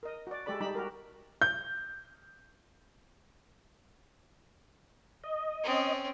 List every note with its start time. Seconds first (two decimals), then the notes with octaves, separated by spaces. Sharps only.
0.03 A#4 D#5
0.27 F#4 D5
0.46 G#3 G4 A4 D5 B5
0.60 G3 D#4 A5 B5
0.75 F#4 G4 A#4
1.42 G6
5.24 D#5
5.63 C4 C#4